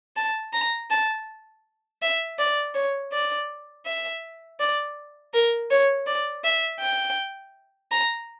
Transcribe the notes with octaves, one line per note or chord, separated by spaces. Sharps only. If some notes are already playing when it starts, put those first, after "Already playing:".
A5
A#5
A5
E5
D5
C#5
D5
E5
D5
A#4
C#5
D5
E5
G5
A#5